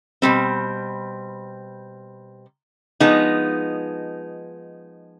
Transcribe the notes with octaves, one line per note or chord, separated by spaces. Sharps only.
B2 G3 C4
F3 G#3 B3 D#4